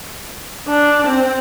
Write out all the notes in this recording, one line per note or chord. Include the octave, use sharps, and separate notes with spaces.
D4
C4